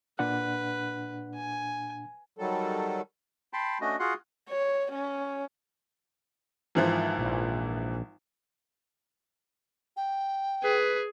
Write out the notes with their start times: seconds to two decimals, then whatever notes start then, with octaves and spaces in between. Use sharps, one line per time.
0.19 A#2 D4 B4 F#5
1.35 G#5
2.38 D#3 F#3 G3 A4
3.53 G5 A5 B5 C6
3.81 A3 C#4 D4 F#4 D#5
3.99 F4 F#4 G#4 F#5 C6
4.50 C#5
4.92 C#4
6.75 G#1 E3 F3
7.18 A#1
9.97 G5
10.63 G#4 B4